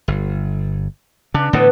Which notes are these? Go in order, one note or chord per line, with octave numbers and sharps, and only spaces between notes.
G1
C#3 D4
A2 D3 E3 B3